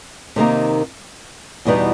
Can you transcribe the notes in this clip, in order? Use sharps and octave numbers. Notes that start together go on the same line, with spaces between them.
C3 D#3 G3 A#3 D#4
E2 B2 G3 B3 D#4